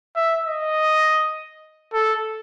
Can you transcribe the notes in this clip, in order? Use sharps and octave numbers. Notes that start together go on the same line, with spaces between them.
E5
D#5
A4